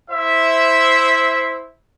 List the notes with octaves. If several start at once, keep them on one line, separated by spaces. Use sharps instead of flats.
E4 C5 E5